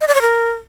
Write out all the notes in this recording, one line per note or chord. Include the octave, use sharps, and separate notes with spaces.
D#5
D5
C#5
A#4